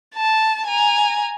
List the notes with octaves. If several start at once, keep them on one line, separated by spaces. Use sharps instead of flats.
A5
G#5 A#5